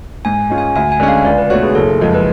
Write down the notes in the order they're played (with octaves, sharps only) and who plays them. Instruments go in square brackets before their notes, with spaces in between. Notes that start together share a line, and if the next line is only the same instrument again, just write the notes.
[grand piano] G#2 [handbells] G#5
[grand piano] G#3 C#4 F4
[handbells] G#5
[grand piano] D2 [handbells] G#5
[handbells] G#5
[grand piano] D3 G#3 C#4
[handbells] F5
[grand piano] C#2 [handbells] D5
[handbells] B4
[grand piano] B2 A3 D4 F#4 [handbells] C#5
[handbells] G#4
[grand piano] F#1 [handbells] A4
[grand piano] F2 F3 G#3
[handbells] B4